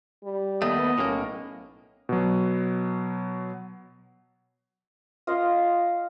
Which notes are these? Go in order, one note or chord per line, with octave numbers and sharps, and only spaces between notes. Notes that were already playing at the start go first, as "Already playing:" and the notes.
G3
D#2 A3 B3 D#5
B1 A2 A#3 C#4
B2 F#3
F4 D#5 F5